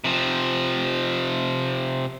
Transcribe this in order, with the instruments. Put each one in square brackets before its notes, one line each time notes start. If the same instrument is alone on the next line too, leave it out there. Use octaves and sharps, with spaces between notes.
[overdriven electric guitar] C3 F3